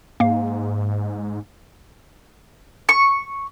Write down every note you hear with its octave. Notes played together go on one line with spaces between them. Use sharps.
G#2 A#3 F5
C#6